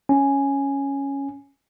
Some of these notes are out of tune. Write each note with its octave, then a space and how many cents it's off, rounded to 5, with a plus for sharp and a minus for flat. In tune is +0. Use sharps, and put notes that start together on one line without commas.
C#4 +0 G#5 +0